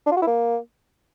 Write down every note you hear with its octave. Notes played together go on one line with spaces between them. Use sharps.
D4
F4
F#4
E4
A#3